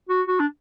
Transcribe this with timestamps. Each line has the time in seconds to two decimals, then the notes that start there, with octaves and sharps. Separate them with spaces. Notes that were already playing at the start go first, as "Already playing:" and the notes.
0.09 F#4
0.28 F#4
0.40 D4